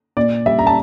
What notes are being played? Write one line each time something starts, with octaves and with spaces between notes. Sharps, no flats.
A#2 D5
G3 E5
A#5
A5